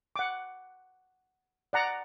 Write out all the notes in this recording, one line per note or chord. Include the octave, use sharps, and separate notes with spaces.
F#5 D6
D5 F#5 A#5